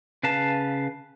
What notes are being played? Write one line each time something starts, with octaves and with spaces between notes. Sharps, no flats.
C#3 B4 F5 A5